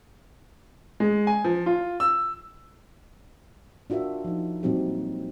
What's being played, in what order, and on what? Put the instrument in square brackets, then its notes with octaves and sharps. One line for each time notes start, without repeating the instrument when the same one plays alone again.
[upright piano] G#3
G#5
F3
F4
E6
[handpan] D4 F4 F#4 A#4 E5
F3 D#4
A#2 F#3 G3 C4 D#4 G4